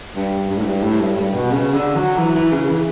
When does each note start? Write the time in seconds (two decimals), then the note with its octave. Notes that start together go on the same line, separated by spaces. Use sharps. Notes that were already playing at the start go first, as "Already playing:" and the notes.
0.16 G2
0.50 G2
0.58 A2
0.64 G2
0.83 A2
1.01 G2
1.17 G2
1.34 B2
1.51 C#3
1.74 D3
1.96 F#3
2.18 E3
2.35 E3
2.52 C#3
2.68 E3